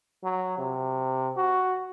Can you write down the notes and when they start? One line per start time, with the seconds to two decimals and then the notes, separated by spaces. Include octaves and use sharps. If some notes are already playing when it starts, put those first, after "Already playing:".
0.24 F#3
0.58 C3
1.37 F#4